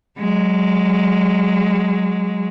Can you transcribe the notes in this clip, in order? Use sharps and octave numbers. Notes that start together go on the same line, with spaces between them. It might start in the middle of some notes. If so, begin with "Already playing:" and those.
F#3 G#3